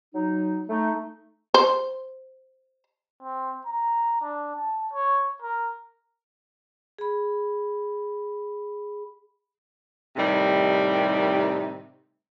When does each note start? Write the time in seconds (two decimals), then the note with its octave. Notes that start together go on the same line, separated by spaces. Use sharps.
0.14 F#3 D#4
0.68 A3 D#4
1.54 C5
3.22 C4
3.66 A#5
4.22 D4
4.56 A5
4.93 C#5
5.42 A#4
6.98 G#4 B5
10.16 A2 C3 D#3 G3 D#4